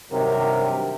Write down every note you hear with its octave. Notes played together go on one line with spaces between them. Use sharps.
G2 C3 D#3 F#3 A#4